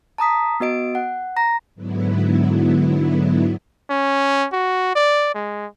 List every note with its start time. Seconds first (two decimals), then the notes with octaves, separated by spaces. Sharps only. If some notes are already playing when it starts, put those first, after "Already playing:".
0.18 A5 A#5 D#6 B6
0.60 B3 F#4 D#5 D7
0.95 F#5
1.36 A#5 A#6
1.75 G#2 D3 F#3 B3 E4
3.90 C#4
4.53 F#4
4.96 D5
5.34 G#3